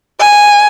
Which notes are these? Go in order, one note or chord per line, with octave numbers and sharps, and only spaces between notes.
G#5